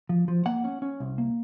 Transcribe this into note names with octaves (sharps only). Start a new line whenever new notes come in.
F3
F3
A#3 F#5
C#4
C#4
C2
A#3